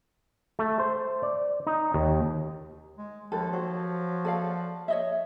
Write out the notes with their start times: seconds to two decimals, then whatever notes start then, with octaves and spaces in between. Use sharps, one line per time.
0.59 A3
0.80 C5
1.23 D5
1.67 D#4
1.94 D#2
2.98 G#3
3.32 D#2 F3 A4
3.53 F#3 C5
4.25 A4 D5 F5
4.88 C#5 D#5 E5